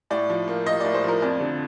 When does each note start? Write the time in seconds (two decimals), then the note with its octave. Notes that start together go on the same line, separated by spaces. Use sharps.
0.10 A2 D5
0.29 F3
0.48 A#3
0.66 A#3 D#5
0.80 A2 D5
0.94 C5
1.04 F3 A#4
1.22 F2 D5
1.41 D3